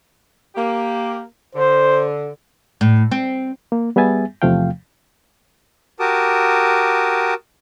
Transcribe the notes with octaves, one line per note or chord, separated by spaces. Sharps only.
A#3 G4
D3 C5
A2
C4
A#3
G3 B3 G#4 E5 G#5 A6
E2 C3 F3 A3 F5 G5
F#4 G4 A#4 A5 D6 D#6